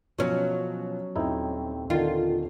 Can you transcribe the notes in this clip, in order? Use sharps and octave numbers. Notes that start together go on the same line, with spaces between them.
B2 F3 F#3 C#4
D#1 C4 D#4 E4 G5
D3 D#3 F4